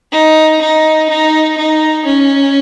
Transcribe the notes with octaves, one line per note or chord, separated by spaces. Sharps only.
D#4
D#4
D#4
D#4
C#4